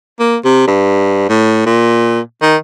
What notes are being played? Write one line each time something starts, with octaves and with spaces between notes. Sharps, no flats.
A#3
C3
G2
A2
A#2
D#3